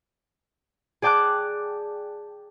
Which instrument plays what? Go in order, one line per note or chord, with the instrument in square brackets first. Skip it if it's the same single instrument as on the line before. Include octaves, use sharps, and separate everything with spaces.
[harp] G#4 D5 G5 A5 D6 F#6